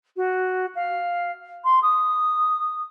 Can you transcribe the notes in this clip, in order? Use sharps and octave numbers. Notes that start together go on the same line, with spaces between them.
F#4
F5
C6
D#6